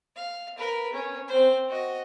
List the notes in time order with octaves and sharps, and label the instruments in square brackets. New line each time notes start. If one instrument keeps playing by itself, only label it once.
[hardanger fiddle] F5
A#4 B4
C#4
C4 C5
F#4 D#5